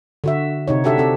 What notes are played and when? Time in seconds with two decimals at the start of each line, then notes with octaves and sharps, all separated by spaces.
0.24 D3 F#4 E5
0.67 C3 D#4 C#5
0.84 D4 F#4 G4 A4 E5
0.98 C4 A4